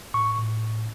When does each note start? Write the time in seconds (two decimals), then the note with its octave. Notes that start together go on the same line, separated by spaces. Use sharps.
0.14 A2 C#6
0.39 A2